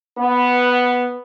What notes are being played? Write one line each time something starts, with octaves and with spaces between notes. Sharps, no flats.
B3